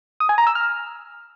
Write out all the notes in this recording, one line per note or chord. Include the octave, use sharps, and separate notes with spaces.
D#6
G#5
A#5
E6
F6